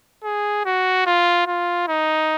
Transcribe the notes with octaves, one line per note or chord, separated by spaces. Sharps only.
G#4
F#4
F4
F4
D#4